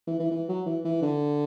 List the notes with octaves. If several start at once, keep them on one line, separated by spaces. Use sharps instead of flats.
E3
E3
E3
F#3
E3
E3
D3